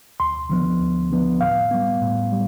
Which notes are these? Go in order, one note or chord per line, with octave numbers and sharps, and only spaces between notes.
D2 C6
D3 F3 B3
D2
D3 F3 B3
A2 F5
G3 B3
A2
G3